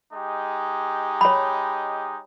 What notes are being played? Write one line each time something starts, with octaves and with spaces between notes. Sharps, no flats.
G#3 D#4 G4
C#5 B5